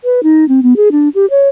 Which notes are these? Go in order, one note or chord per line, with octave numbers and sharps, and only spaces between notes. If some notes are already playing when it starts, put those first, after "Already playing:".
B4
D#4
C4
B3
G#4
D4
G4
C#5